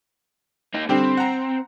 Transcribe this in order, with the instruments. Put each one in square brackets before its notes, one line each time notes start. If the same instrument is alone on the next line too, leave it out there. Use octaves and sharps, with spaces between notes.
[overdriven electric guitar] A#3 D#4
[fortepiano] D3 G3 G4 [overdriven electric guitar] C4
[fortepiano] F#5 A#5